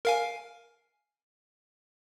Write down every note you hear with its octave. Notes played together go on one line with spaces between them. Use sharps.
A#4 F5 G#5